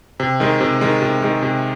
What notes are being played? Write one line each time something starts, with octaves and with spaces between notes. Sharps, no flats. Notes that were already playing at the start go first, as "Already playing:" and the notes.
C3
D#3 G#3
C3
D#3 G#3
C3
D#3 G#3
C3